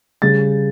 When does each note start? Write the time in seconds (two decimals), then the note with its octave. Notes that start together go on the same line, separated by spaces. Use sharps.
0.22 C#3 G3 A6